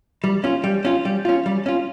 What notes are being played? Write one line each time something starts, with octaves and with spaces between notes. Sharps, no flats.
G3
C#4 F4
G3
C#4 F4
G3
C#4 F4
G3
C#4 F4